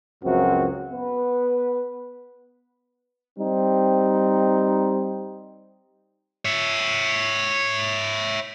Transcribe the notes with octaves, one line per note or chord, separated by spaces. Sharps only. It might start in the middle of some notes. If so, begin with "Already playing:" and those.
C#2 F#2 F3 C4 F#4
B3 B4
G3 C4 D#4
C#5 E5